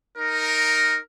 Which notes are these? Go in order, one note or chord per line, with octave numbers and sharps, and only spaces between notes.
D#4 A#4